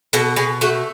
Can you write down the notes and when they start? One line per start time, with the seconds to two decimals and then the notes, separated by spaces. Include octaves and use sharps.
0.13 B2 A4
0.36 B2 G#4
0.61 A3 F#4